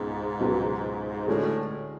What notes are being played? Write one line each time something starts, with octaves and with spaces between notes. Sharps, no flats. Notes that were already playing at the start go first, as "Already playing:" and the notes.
Already playing: C#2 G#2 B2
C#2 B2 F#3
A2 D3 G#3 C#4 F#4